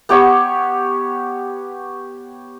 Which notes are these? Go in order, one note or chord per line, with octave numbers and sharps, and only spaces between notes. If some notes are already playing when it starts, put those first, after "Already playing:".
B3 G4 C#5 C#6